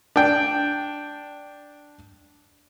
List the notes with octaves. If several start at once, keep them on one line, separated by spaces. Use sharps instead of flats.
D4 G5